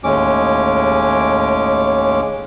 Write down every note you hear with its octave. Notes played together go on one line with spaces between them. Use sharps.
D#2 A2 G#3 C#4 D6